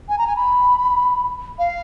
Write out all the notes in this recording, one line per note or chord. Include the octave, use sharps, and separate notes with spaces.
G#5
A#5
G#5
B5
F5